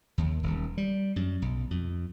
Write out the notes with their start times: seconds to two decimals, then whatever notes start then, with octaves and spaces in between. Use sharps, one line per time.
0.18 D#2
0.43 D#1
0.78 G3
1.16 F#2
1.42 B1
1.71 F2